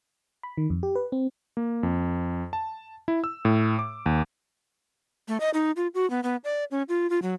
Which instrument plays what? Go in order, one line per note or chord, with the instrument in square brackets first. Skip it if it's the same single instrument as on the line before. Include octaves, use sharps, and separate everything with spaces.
[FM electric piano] B5
D#3
F2
G4
B4
C4
[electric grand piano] A#3
F2
A5
E4
E6
A2
D6
D#2
[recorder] A3
D#5
D#4
F4
F#4
B3
B3
D5
C#4
F4
F4
F#3